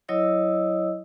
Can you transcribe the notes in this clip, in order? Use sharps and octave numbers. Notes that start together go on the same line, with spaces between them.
F#3 E4 C#5 D#5 D#6 E6